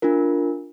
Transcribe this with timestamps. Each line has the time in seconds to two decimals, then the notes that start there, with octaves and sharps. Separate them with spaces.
0.02 D4 F4 A#4